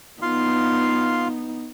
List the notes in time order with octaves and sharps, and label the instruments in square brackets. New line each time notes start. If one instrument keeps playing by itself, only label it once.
[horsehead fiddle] B3 D#4 [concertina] F4 F5 C6